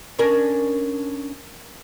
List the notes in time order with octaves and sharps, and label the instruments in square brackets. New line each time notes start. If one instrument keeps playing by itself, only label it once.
[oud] C#4 D4 A#4